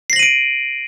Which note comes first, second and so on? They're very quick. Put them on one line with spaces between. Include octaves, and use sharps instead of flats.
C7 A#6 F#7 D#7 D7